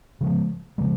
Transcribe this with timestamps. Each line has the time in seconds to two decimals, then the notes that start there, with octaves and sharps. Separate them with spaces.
0.21 C#3 F3 G#3
0.78 C#3 F3 G#3